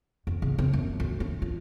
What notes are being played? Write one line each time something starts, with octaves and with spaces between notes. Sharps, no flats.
F2
C#3
C4
F#2
D2
D4
F4